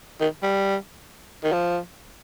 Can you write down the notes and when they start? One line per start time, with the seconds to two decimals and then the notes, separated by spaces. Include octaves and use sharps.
0.21 D#3
0.43 G3
1.44 D#3
1.52 F3